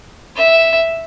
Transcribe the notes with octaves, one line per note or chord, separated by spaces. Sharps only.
E5